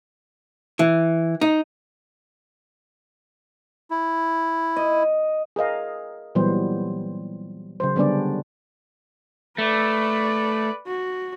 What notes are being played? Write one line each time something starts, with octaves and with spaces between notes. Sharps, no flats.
E3
D#4
E4
D#5
G#4 A#4 D#5 F5
A#2 E3 F#3 G3 B3 C5
C#3 F#3 C5
D3 G3 B3 C#4 D4 D5
A3 B4 D5
F#4